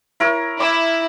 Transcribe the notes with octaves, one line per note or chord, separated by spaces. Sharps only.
E4 A#4 C#5
E4 D6